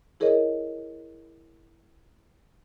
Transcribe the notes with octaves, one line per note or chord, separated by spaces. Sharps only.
E4 G#4 A#4 C#5 D#5